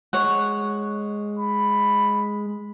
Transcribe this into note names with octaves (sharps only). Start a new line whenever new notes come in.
G#3 C#5 F#5
B5